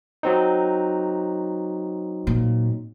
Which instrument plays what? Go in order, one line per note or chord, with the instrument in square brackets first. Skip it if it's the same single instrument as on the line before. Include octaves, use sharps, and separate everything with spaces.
[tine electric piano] F#3 C4 D#4
[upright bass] A#2